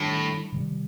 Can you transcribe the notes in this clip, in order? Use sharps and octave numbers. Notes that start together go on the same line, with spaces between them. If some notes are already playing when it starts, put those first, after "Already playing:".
Already playing: A2 D#3 G3 D4
C3 D#3 G3